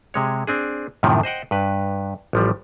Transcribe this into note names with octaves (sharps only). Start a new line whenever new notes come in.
C3 G#3 C#5
C4 D4 G#4
F#2 A2 C3 D#3 F3
C5 D#5 F#5 G5
G2 B4
A1 F3 G3